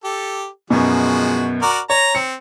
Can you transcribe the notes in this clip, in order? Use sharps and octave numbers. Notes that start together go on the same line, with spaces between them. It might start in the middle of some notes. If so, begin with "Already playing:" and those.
G4 A4
F#2 B2 F3 G#3 F#4
F#4 A#4 D5
C#5 A#5
C4 C#7